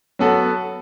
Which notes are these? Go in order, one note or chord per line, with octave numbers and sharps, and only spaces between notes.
F#3 B3 F#4 A4